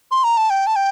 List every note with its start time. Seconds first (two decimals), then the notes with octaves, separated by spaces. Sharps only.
0.11 C6
0.24 A#5
0.37 A5
0.50 G5
0.67 A5
0.76 G5